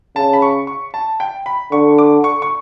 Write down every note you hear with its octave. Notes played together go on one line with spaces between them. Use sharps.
C#3 A5
B5
C#6
C#6
A5
G5
B5
D3 C#6
D6
C#6
C#6